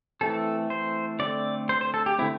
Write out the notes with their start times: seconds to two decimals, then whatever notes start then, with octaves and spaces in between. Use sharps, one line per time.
0.21 E3 A3 C4 A4
0.70 C5
1.19 D3 A3 C4 D5
1.69 C5
1.81 C5
1.94 A4
2.06 G4
2.19 D3 A3 C4 E4